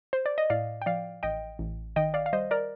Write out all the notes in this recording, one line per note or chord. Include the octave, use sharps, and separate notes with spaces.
C5
D5
D#5
A2 D5 F5
G5
F3 D5 F5
A1 D#5 G5
A1
D#3 D#5 G5
D5 F5
F5
G3 C5 D#5
A#4 D5